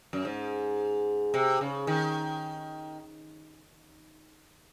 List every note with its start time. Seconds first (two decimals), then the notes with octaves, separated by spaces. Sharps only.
0.13 F#2
0.25 G#2
1.34 C3
1.61 C#3
1.87 D#3